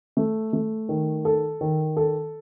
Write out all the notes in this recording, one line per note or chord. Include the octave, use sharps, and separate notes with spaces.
A3
A3
D#3
A4
D#3
A4